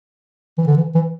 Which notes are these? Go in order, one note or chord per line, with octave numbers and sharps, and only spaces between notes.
E3
D3
E3
E3